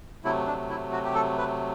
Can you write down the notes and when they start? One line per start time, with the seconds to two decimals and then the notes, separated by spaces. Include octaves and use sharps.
0.24 C3 F#3 A3 E4
0.47 D4
0.69 E4
0.92 F#4
1.05 G4
1.15 A4
1.38 B4